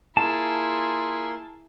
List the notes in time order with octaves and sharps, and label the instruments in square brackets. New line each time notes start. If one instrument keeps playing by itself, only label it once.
[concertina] A#3 F4 C6 [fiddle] E4 G#4 [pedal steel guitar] A5